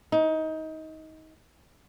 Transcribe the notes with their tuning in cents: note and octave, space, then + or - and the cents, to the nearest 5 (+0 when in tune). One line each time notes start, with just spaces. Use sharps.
D#4 +20